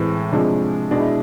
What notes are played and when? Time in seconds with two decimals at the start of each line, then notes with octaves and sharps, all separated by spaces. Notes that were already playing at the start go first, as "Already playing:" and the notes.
Already playing: A2 E3 G#3 C4
0.32 C3 F3 G#3 D4
0.91 B2 G#3 D4
1.00 E4